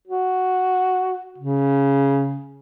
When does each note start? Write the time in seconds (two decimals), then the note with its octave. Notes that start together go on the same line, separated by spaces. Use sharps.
0.08 F#4
1.38 C#3